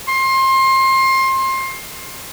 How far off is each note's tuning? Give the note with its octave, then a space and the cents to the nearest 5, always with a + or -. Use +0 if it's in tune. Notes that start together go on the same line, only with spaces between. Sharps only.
C6 +25